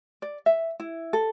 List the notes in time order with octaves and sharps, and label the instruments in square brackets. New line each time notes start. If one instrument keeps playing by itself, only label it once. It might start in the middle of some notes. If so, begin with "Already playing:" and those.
[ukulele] D5
E5
E4
A4